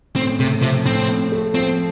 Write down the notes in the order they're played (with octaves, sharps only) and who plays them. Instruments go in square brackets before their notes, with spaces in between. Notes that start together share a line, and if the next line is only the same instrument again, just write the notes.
[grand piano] A2 [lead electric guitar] C4
[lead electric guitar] C3 [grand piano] A3
[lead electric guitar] C3 [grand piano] F3
[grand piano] A2 [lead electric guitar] C4
[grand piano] A2
A3
[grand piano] F3 [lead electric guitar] C4